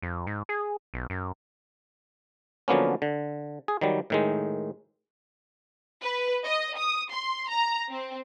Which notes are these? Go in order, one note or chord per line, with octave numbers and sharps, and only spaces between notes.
F2
G#2
G#4
B1
F#2
D3 F3 F#3 A#3 B3 C#4
D3
G#4
D#3 F#3 G3
A2 D#3 G#3
B4
D#5
D#6
C6
A#5
C4